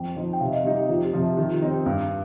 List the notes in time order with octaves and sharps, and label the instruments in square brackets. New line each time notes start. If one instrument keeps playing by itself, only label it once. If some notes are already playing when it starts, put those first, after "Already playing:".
Already playing: [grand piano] F2 [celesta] G5
[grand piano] F3 D#4
[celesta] G5
[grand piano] C3 [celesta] F5
[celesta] D#5
[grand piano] G3 D#4 [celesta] G4
[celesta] G4
[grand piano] F2 [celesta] F4
[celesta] G4
[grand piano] C3 F3
[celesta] G4
[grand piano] D#3 [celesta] G4
[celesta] F4
[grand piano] C4 D#4 [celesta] G4
[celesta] G4
[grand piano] G2